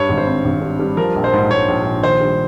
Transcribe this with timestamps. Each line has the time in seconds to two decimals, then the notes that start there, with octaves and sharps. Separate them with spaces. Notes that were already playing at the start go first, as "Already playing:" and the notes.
Already playing: G2 C#5
0.09 G#1
0.18 C5
0.27 C4
0.44 G#1
0.61 G3
0.79 G3
0.97 F3 A#4
1.15 A#1
1.24 C5
1.33 G#2
1.51 G#2 C#5
1.68 A#1
1.85 A#1
2.03 D#3 C5
2.21 G3